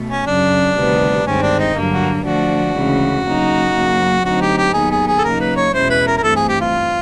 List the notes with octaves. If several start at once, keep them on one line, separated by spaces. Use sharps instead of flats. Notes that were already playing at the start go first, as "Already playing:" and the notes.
Already playing: B2 A3
C#4
F#2 C#3 F#3 D4
D2 C3 D#3 G3 B3
G2 D#3 G#3 C4 C#4
D4
D#4
G2 D3 F#3 A#3
F#4
D3 F3 A3 D4 F#4
D2 C#3 E3 G#3
C#3 F#3 A#3 D#4
F#2 C#3 F#3 A#3
D3 F#3 A3 C4 D#4 F#4
G4
G4
D#2 D#3 F#3 B3 G#4
G#4
G#4
A4
C#3 F#3 A#3 D#4 A#4
B4
C#5
E2 B2 G#3 C#4 E4 C5
B4
A#4
A#4
G2 E3 A3 C4 A4
G#4
G4
F4